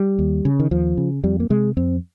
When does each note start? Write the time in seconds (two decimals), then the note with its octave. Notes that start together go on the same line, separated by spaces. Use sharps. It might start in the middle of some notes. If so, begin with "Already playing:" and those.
Already playing: G3
0.19 D#2
0.45 C#3
0.60 D#3
0.71 D#2 F3
0.97 C#3
1.23 F2 G3
1.40 A#3
1.50 C3 G#3
1.77 F2 C4